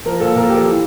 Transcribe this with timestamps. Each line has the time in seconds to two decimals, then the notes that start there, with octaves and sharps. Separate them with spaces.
0.06 F3 A#4
0.16 A#4
0.20 A#2 A4
0.35 A#2 A#4
0.43 A4
0.49 F3 G4
0.57 A4
0.66 E3